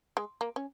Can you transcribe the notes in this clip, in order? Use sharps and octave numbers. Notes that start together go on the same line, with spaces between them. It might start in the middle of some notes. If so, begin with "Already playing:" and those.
G#3
A#3
C#4